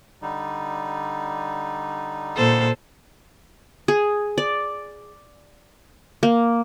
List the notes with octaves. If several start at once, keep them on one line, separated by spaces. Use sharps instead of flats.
D3 G3 D#4
A#2 A4 C5
G#4
D5
A#3